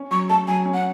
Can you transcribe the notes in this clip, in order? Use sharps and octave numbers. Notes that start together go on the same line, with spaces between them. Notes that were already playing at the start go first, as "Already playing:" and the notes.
Already playing: C#4
F#3 C#6
A3 A5
F#3 G#5
C#4
F#5